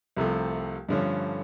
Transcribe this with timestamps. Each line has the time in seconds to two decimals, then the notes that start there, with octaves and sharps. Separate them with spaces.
0.17 C2 C3 F3 A3
0.89 G2 D3 F3 A3 C#4